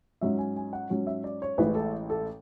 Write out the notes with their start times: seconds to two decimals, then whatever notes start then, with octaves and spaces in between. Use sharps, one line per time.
0.21 G#2 F#3 C#4 E5
0.38 G#5
0.56 G#5
0.73 F#5
0.90 G#2 F#3 C#4 C#5
1.07 E5
1.24 D5
1.42 C#5
1.58 A1 A2 E3 G#3 B4
1.75 A4
2.10 A4